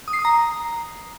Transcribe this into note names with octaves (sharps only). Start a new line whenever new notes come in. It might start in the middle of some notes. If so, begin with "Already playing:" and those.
D#6
C7
D#6
A#5